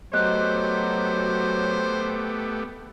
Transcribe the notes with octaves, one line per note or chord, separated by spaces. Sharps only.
F#3 A3 B3 G4 C5 D#5 F#6